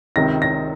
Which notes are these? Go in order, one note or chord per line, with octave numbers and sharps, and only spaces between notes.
C#2 C3 D#3 A#6
A#6